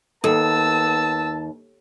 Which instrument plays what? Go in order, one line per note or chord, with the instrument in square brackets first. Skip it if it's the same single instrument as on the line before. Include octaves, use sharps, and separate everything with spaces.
[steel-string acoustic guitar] D#2 [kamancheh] B3 E6 [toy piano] A4 [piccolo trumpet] A5